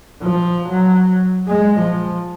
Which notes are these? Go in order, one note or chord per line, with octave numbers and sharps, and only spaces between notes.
F3
F#3
G#3
F3